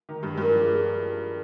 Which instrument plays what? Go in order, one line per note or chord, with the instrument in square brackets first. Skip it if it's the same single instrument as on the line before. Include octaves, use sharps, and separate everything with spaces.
[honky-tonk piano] D#3
[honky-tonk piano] G2 [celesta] G4
[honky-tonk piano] G2 [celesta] A#4
[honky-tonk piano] F3
[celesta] G#4